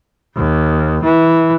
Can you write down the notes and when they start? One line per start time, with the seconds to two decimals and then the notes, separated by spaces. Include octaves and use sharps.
0.36 D#2
1.04 E3